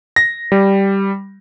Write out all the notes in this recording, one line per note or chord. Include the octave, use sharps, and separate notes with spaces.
A#6
G3